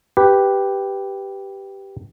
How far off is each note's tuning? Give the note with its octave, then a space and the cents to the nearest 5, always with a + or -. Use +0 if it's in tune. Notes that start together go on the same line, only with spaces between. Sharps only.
G4 +0 B4 +0